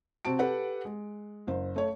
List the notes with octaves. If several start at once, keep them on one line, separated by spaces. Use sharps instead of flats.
C3 C4 F#4 A5 D7
G4 A4 B4 F#5
G#3
F#1 C5
A3 C#5